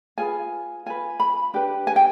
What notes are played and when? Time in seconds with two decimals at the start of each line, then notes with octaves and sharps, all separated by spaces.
0.18 F4 G#4 B4 G#5
0.86 F4 B4 G#5
1.20 B5
1.54 D4 G4 B4
1.87 G#5
1.96 G5